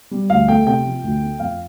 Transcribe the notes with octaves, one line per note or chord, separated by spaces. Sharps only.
G3
D2 F5
A3 G5
C3 G5
F3
D2
A3
F2 F5